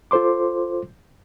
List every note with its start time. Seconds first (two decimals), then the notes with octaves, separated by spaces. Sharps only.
0.11 F4 A4 C5 C6 D6